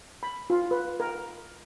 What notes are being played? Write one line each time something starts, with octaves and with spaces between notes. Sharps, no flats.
B5
F4
B4
A#4